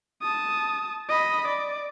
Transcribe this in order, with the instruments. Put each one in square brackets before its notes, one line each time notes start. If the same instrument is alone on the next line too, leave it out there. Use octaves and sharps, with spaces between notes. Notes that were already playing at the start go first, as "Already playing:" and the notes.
[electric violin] A5 D#6
D#5 B5
D5